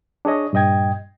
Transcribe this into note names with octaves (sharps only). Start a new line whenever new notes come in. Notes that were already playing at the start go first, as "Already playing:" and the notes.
D4 G#4 C#5 D#5
G2 A#2 D#5 G5 G#6